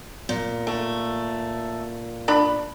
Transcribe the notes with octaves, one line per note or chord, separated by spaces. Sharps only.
A#2
A3
D4 B5